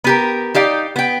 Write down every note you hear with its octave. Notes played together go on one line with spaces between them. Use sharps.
B3 G4 A#4
D#4 G4 D5 F5
B3 G5